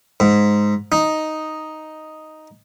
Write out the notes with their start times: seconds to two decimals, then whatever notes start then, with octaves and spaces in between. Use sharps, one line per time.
0.20 G#2
0.92 D#4